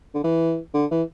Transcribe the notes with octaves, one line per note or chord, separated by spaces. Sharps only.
D3
E3
D3
E3